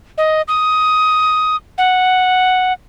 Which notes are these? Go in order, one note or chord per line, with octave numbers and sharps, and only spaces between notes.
D#5
D#6
F#5